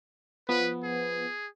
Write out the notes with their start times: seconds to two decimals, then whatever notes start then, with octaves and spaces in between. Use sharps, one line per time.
0.49 F3 B3 B4
0.83 G#4